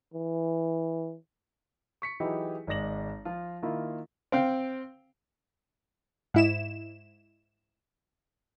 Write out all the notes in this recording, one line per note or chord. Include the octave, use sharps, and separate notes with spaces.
E3
C#6 B6 C#7
E3 F#3 D#4 E4 G4 G#4
G#1 G#3 D5 A#6 F#7
F3 F4
D#3 A#3 E4 F4
C4 F5 G5
G#2 E4 E7